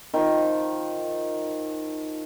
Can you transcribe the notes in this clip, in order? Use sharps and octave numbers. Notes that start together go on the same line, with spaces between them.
D#3 F3